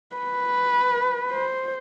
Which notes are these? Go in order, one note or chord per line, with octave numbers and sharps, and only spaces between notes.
B4
C5